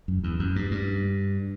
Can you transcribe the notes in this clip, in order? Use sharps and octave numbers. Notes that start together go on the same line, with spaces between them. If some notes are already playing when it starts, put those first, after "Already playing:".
F#2
E2
F#2
G2
G2